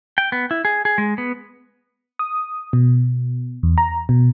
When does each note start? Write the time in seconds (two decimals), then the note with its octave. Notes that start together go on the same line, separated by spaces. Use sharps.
0.18 G5
0.32 B3
0.51 E4
0.65 G#4
0.85 G#4
0.98 G#3
1.18 B3
2.19 D#6
2.73 B2
3.63 E2
3.78 A#5
4.09 B2